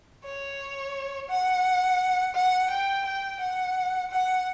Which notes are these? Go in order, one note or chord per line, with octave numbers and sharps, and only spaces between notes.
C#5
F#5
F#5
G5
G5
F#5
F#5